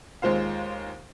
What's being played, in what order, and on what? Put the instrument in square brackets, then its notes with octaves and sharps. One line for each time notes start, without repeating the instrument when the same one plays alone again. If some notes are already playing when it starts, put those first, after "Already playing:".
[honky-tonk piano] D#2 G#3 F4 C5 F5